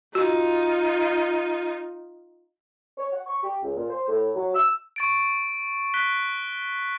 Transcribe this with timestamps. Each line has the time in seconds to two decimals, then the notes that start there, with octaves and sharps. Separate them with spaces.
0.15 D#4 F4 F#4
2.98 C#5
3.13 F#5
3.27 C#6
3.43 G4
3.63 C#2
3.77 A#2
3.90 C5
4.08 A2
4.35 F#3
4.55 E6
4.96 C#6 A6 D7
5.94 F#6 B6 G7